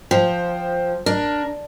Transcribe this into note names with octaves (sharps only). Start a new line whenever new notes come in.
F3 C5 G5
D4 A#4